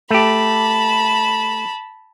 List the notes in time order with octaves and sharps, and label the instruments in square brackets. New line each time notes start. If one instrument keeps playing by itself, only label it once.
[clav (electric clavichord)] A3 G4 [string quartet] A5 B5